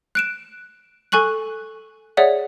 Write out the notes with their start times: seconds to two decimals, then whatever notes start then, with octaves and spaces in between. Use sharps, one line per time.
0.15 F#6 D7 E7
1.12 A4 G#5 C#6 F#6 F#7
2.17 G#4 C#5 D5 E5 F#5